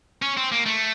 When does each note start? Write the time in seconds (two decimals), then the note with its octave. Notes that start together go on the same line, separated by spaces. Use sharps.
0.22 C#4
0.37 C4
0.52 A#3
0.66 A3